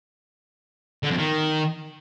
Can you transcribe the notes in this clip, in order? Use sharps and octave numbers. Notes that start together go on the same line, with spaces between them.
D3
F2
D#3